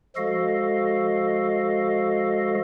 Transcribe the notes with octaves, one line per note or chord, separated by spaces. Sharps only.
F3 G#3 F#4 A4 D#5 F5